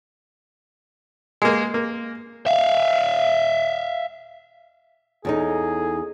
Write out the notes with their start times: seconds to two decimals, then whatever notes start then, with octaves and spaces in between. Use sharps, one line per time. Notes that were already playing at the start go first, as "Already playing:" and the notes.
1.42 G#3 A#3
1.74 A#3
2.47 E5 F5
5.25 E2 C#4 D#4 G#4 A4